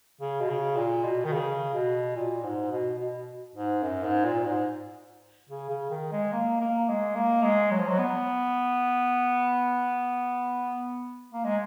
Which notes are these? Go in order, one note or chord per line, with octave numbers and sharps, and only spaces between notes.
C#3
B2
C#3
A#2
B2
D#3
C#3
B2
A#2
G#2
B2
B2
G#2
F#2
G#2
A#2
G#2
C#3
C#3
D#3
G#3
A#3
A#3
G#3
A#3
G#3
F#3
F3
F#3
B3
A#3
G#3